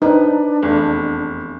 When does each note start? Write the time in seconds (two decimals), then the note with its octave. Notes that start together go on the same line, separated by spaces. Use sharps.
0.02 D4 D#4 B4 C5 D5
0.62 F1 E2